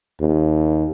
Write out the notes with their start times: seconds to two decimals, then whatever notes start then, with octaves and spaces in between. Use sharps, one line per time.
0.21 D#2